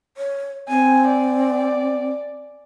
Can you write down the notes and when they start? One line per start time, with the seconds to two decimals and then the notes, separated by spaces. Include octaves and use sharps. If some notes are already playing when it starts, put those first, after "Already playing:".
0.17 C#5
0.69 C4 G#5
1.08 D5